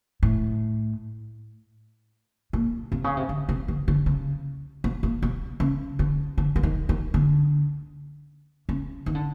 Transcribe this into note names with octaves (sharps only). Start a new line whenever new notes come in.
A2
A#2
C3
C#3
C3
D3
C3
D3
D3
C#3
B2
A#2
B2
C#3
D3
D3
E3
D#3
D#3
D3
C#3
D#3
D3